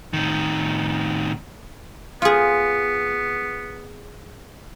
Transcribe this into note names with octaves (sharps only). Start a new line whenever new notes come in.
A2 D#3
B3 F4 G#4